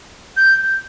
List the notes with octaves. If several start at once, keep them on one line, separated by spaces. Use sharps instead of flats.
G6